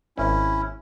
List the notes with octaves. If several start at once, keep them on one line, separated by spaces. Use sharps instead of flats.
G#1 C#4 E4